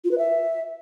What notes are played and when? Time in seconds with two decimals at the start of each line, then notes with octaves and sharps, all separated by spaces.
0.05 F4
0.11 B4
0.18 E5